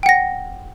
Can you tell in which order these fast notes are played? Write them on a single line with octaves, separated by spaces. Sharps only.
G5 F#5 A#6